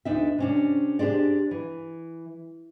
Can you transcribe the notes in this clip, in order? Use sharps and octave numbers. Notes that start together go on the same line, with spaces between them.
D2 D4 D#4 E5
C3 C#4 D4
D4 G4 G#4 C5 D5
E3